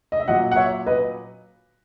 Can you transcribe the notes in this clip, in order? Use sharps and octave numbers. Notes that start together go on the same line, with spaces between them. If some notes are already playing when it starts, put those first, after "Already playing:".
D#5
E5
A#2 F#3 D#5 F#5
F#5
C#5 E5
B4 D#5